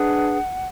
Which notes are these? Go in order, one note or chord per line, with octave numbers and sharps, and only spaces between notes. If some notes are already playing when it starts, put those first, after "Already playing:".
Already playing: D4 G#4 B4 F#5